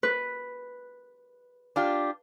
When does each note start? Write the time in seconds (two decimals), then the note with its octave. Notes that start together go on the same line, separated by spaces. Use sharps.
0.03 B4
1.76 D4 F4 G4